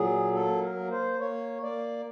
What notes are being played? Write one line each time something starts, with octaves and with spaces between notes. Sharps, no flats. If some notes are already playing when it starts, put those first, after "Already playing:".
Already playing: A#2 F#3 G#4
A#3 A4
A#4
A#3
C5
A#3 C#5
A#3 D5